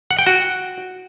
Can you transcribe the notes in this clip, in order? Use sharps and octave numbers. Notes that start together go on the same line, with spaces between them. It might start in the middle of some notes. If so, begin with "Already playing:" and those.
F#5
G5
F#4